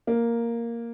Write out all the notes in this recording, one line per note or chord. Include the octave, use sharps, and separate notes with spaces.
A#3